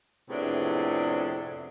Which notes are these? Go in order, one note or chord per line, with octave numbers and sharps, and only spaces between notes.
F2 A2 C3 B3 D4 G#4